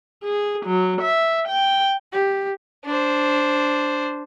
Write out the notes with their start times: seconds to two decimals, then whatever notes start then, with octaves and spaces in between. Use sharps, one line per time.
0.24 G#4
0.66 F#3
1.01 E5
1.49 G5
2.12 G4
2.85 D4 C5